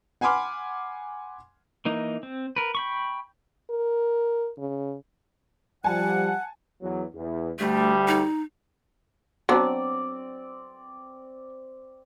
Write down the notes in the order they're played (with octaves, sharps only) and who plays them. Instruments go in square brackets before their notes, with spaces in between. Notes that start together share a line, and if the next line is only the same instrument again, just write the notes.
[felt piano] F#5 G#5 B5 C6 D6 F6
[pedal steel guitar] E3 A#3 D#4
C4
A#4 B4
G5 B5 C#6
[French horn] A#4
C#3
[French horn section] F3 G3 [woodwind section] F#5 [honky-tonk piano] G#5 A5
[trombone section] E2 F#3
E2
[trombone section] D2 G3 [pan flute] A3
[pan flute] D#4
[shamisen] F#3 B3 D4 [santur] C4 D5